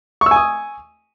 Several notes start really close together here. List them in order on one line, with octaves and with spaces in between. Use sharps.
C#6 E6 G#5 D#6